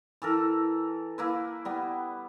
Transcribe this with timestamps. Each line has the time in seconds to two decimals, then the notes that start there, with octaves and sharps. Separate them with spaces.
0.22 E3 A4 A#4
1.18 A#3 E4 B4
1.65 G3 B3